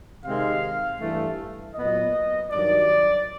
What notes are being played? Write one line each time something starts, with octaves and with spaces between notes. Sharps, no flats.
C3 D#3 G#3 C4 F5
G2 E3 A3
A#2 F#3 B3 D#5
G2 D#3 F#3 D5